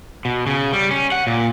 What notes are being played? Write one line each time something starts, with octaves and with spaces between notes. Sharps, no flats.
B2
C#3
G3
C#4
F#5
A#2